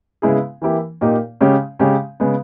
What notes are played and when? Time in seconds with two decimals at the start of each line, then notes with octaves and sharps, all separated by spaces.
0.22 C#3 G#3 B3 E4 G#4
0.62 E3 A#3 E4 G4
1.01 A#2 A#3 D#4 G4
1.41 C#3 G#3 C#4 G4
1.79 C#3 G#3 C#4 G4
2.20 C#3 G#3 B3